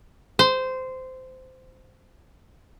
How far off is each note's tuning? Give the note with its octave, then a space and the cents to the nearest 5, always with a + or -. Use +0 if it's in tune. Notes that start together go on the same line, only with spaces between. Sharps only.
C5 -15